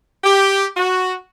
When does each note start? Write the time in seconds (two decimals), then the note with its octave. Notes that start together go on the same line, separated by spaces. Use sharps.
0.24 G4
0.77 F#4